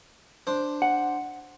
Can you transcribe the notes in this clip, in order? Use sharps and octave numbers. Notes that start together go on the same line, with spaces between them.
D4 C5
F#5